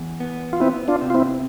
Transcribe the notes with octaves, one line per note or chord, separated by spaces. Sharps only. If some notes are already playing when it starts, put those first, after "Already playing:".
Already playing: E2
B3
F4
B3 C4 E4
D4 F4
C3
F4
C4 E4